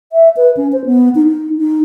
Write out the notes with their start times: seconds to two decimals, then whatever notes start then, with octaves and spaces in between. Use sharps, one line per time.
0.12 E5
0.37 B4
0.57 C#4
0.73 C5
0.86 B3
1.15 D#4
1.27 D#4
1.58 D#4